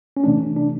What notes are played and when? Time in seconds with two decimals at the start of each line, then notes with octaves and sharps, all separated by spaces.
0.17 C#4
0.24 C3 E3 A3 D4
0.57 D4